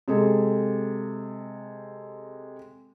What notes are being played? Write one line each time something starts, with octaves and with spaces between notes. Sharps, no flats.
C3 G#3 A4